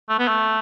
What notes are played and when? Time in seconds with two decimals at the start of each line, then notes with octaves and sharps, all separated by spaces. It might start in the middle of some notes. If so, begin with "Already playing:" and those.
0.09 A3
0.19 B3
0.28 A3